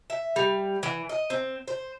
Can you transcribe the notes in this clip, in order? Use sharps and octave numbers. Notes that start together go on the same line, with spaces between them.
E5
G3
E3
D#5
C4
C5